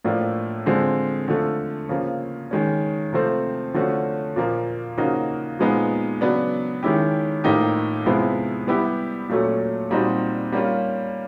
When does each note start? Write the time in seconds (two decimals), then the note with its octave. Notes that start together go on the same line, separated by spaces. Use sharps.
0.05 A2 F3 A#3 D4
0.66 D3 F3 G#3 C4
1.28 D3 F3 A3
1.89 C#3 F3 A#3
2.51 D#3 G#3 C#4
3.13 C3 F3 A3 C4
3.74 D3 F3 A3 C#4 F#4
4.36 A#2 F3 A#3
4.98 C#3 F3 A#3 D#4 F#4
5.59 A#2 F3 G#3 B3 D#4
6.21 C#3 F#3 B3 D4
6.83 D#3 G#3 C#4 E4 G4
7.44 A2 F3 A#3 D#4 G4
8.06 C3 F3 G#3 B3 E4
8.67 G3 B3 E4 G4
9.29 A#2 F#3 A3 C#4
9.90 A#2 G3 C4 D#4 F#4
10.52 G3 A#3 C#4 F4